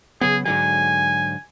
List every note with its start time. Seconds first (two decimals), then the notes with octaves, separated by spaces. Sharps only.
0.21 C#3 F#3 B3 G#4
0.46 G#2 D3 F#3 G#5